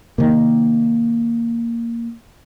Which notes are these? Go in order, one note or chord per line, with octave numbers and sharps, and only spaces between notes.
C3 D#3 A#3